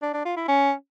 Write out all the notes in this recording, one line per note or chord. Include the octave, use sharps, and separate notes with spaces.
D4
D4
F4
E4
C#4